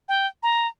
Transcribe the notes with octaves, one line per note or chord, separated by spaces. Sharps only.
G5
A#5